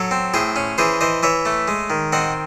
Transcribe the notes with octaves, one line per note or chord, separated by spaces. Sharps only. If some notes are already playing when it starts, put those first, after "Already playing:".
Already playing: F#3 A4 C#5
C4
A2 G#4 C5
C#4
E3 G#4 C5
E3 C5 D#5
E3 C#5 E5
A3
G#3
D#3
C4 D#5 F#5